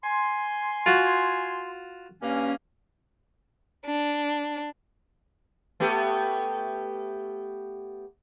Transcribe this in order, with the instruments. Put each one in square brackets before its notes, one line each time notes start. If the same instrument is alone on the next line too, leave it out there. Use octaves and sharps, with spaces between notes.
[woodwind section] G#5 C6
[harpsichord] F4 F#4
[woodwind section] G2 A#3 C#4
[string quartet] D4
[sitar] A3 B3 G4